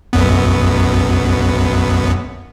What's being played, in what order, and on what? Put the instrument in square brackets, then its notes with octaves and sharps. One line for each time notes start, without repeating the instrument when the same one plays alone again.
[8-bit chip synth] B1 F#2 B3